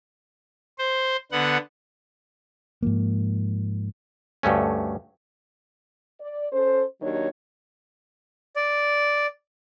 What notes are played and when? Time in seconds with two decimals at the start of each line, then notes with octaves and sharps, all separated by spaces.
0.78 C5
1.32 D3 B3 F#5
2.83 G#2 F3 A#3
4.43 D2 G2 A3 C#4
6.20 D5
6.51 C#4 A4 C5
7.01 D#2 D#3 F#3 D4 C#5
8.56 D5